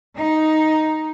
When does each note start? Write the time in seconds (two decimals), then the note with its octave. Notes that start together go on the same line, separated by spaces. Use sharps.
0.17 D#4